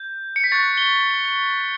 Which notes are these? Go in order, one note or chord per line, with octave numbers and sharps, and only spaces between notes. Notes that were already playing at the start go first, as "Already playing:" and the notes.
Already playing: G6
C#7
B6
C#6 F#6 A6
G7